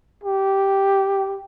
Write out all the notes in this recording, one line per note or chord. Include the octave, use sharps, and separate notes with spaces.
G4